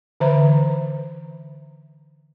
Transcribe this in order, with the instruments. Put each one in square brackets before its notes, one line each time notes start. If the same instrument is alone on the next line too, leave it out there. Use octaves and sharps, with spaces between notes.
[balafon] D3 E3 B4 C5 E5 A#5